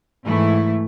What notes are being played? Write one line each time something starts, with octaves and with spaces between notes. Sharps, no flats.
G#2 E3 A3 E4